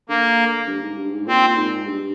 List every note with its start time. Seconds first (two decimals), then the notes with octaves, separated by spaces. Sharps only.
0.09 D3 A#3
0.68 G2
0.82 G#2
0.98 G2
1.13 G#2
1.27 A#2 C4
1.56 G#2
1.86 G2